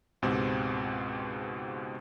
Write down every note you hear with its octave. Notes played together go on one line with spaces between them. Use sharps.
C#2 G#2 B2 C4 G4